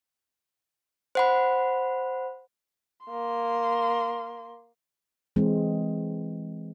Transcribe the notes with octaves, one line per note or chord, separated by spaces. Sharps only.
C5 F#5 B5
A#3 C6
E3 G#3 C4